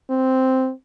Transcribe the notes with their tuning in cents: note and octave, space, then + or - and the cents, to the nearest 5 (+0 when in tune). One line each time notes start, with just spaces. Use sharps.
C4 -5